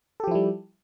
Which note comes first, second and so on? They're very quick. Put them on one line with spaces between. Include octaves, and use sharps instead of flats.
A4 G4 F3 E4 G3